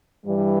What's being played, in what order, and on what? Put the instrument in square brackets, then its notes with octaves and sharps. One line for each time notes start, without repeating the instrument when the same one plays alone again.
[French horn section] G2 E3 G3